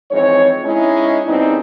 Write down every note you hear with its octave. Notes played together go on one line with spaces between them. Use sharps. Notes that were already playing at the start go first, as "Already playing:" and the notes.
F2 G#2 E3 C4 C#5
G#3 C#4 D#4 E4
D#2 C#3 B3 C4 D4 D#4